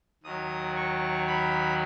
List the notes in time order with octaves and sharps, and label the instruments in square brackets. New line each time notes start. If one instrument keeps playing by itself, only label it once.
[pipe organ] D#2 D#3 F#3 D#6
C#6
B5